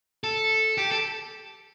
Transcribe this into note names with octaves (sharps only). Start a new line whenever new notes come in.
A4
G4
A4